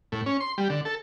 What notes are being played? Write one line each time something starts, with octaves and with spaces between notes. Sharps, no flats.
A2
C#4
C6
G3
D3
A4